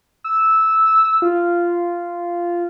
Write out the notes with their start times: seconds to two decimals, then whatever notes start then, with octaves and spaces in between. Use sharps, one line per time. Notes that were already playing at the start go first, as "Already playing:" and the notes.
0.24 E6
1.22 F4